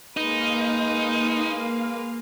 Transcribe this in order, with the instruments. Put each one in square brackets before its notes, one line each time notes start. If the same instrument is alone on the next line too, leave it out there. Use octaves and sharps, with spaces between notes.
[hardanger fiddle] G#3 B4 [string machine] A#3 F5 [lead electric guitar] D#4